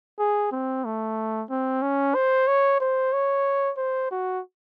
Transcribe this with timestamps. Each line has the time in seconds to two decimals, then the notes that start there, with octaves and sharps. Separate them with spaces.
0.19 G#4
0.52 C4
0.85 A3
1.50 C4
1.82 C#4
2.15 C5
2.47 C#5
2.80 C5
3.13 C#5
3.77 C5
4.11 F#4